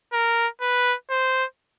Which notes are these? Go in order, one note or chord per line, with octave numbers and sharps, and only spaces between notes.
A#4
B4
C5